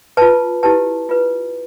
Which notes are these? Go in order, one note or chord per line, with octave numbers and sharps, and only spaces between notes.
F4 B4 A5
E4 G4 B4 A5
F4 B4